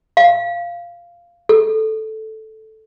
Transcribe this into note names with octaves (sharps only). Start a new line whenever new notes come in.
F5
A4